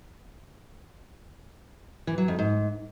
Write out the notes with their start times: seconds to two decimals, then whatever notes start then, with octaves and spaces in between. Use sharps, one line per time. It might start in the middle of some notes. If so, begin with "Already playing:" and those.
2.07 E3
2.18 F#3
2.28 F2
2.39 G#2